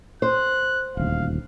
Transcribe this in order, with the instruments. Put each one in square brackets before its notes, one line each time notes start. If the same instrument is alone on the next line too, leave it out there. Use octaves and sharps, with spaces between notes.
[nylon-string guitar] C5 [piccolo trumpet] F#6
[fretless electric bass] D#1 D2 [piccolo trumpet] F5